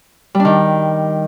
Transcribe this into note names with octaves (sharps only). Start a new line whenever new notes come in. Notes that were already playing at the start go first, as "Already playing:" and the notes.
G3
D4
D#3